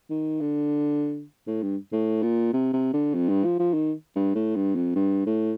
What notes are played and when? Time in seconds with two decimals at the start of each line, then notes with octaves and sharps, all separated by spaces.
0.10 D#3
0.40 D3
1.47 A2
1.62 G2
1.92 A2
2.23 A#2
2.53 C3
2.73 C3
2.93 D3
3.14 F2
3.29 G2
3.44 F3
3.59 F3
3.74 D#3
4.15 G2
4.35 A2
4.55 G2
4.75 F2
4.95 G2
5.26 A2